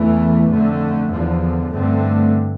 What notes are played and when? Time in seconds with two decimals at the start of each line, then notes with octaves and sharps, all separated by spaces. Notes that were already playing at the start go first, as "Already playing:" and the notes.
Already playing: E2 E3 A3
0.50 F2 D3 A3
1.10 E2 D3 F3
1.71 G2 D3 A3 C4